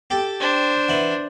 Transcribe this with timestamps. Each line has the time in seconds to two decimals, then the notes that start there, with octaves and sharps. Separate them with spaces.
0.10 G4 A4
0.40 D4 C5
0.88 E3 F#5